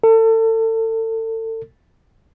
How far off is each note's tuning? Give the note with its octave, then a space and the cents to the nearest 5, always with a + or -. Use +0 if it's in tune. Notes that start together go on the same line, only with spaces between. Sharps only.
A4 +30